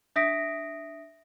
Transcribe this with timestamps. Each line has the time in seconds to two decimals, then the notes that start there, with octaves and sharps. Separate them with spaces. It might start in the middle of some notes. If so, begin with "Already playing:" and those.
0.16 D4 E5 D#6 A#6 B6 D7